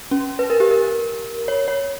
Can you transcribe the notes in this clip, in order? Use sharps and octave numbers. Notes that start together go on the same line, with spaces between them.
C#4
B4
A#4
G4
A#4
C#5
C#5